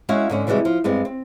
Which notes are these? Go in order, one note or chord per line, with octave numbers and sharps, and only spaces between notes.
G#3 C#4 E4 F#4 F5 F#5
G#2 D3 C#4
C3 E3 G3 G#3 F#4
F3
G2 G#3 B3 C4
C4